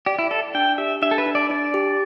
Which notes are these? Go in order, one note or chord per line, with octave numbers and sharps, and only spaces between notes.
G4 D5
E4
A4 D5
D4 G5
G4 E5
D4 E5
A4
B4
D4
D5
D4 D5
G4